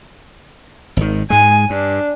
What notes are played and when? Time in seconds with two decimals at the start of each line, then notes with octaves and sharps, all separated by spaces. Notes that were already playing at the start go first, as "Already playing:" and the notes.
0.97 G#1 D#3
1.30 G#2 G#3 G#5
1.70 G2 D4